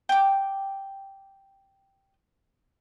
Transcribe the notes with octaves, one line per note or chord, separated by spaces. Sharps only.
G5 D6